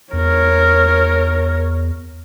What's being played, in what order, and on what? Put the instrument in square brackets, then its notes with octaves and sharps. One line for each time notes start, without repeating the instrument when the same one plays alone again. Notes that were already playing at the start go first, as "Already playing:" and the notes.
[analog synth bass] E2 [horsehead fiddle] A#4 C#5